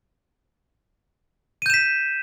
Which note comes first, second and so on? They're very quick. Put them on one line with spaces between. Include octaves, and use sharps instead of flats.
D#7 G6 E7 B6